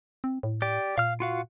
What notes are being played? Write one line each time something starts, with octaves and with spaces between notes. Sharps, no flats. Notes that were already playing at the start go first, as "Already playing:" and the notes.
C4
A2
G4 D5
A#2 F5 F6
F4 F#4 F5